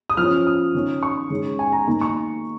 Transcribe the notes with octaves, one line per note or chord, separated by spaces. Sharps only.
D#6
F3 F6
C#4
D#6
D#3 C#4
C#6
D#3 G#3 C#4
G#5
A#5
D#3 A#3 D#4 A#5
C#6